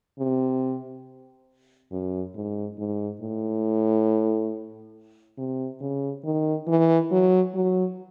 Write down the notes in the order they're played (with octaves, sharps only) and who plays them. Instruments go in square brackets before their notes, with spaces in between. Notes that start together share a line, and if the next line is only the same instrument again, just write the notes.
[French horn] C3
F#2
G#2
G#2
A2
C3
C#3
D#3
E3
F#3
F#3